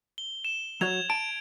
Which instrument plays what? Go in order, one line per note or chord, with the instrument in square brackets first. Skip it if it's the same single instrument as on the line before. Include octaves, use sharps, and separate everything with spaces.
[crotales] G7
E7
[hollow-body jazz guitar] F#3 F#4 C#5 [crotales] G#6 F7
[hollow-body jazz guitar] A5 [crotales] D7